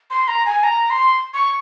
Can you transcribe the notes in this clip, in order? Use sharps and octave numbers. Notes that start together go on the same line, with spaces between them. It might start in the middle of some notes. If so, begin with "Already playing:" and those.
C6
A#5
G#5
A#5
C6
C#6